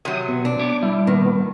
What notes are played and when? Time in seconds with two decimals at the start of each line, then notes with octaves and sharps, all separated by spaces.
0.05 C3 F#3 D#6
0.28 B2
0.45 D4
0.59 B3 C#5 D6
0.83 G3 E4
1.07 A#2 D#3 B3